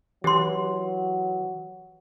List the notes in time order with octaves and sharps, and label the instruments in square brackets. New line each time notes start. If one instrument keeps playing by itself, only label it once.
[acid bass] E3 [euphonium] F#3 [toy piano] G4 C6